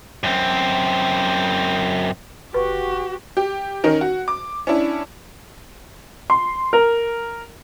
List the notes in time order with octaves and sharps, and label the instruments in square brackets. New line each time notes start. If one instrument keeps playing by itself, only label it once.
[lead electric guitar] F#2 C4
[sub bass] F#1 [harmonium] F#4 [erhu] G4 [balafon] B4
[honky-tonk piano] G4
D#3 C#4 D#4 A#4
F#4
D6
C#4 D4 E4
[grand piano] C6
A#4